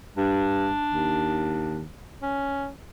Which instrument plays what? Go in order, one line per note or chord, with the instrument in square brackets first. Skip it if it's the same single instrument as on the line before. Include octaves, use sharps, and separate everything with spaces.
[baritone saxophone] G2 [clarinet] D4
[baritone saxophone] D#2
C#4